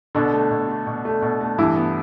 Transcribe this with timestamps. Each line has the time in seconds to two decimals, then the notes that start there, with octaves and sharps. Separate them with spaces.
0.15 B2 D3 D4
0.33 A3
0.51 B2
0.68 A3
0.87 B2
1.05 A3
1.22 B2
1.41 A3
1.58 G2 E3 E4
1.76 B3